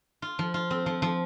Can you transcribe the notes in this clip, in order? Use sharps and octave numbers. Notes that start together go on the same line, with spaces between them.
F4
F3
F4
C4
F3
F3